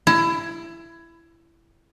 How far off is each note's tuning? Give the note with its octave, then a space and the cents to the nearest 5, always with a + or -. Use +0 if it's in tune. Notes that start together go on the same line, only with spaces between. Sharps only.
E4 +20